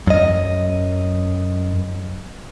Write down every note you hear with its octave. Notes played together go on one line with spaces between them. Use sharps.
F#2 D#5